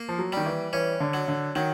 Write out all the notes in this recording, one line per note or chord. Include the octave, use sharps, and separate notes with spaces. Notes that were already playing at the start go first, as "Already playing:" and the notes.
Already playing: A#3
F3
F#3
D#3 G3
E3
E3 C#4
D3
F#3
D3
D#3 F#3